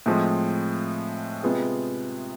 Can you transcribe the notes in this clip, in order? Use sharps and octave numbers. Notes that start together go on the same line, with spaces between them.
A2 F3 G#3 C4
C3 G#3 B3 F4 G#4